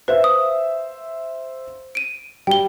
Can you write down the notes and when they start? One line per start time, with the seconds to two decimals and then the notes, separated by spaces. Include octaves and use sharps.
0.08 B4 C5 E5 F5
0.24 D#6
1.95 D7 D#7
2.47 G3 G5 G7